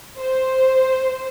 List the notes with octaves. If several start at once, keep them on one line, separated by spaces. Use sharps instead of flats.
C5